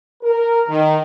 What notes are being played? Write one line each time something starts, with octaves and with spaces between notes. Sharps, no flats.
A#4
D#3